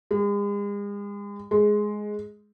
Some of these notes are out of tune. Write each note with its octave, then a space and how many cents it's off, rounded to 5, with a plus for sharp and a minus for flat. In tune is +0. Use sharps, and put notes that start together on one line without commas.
G#3 -40
G#3 +5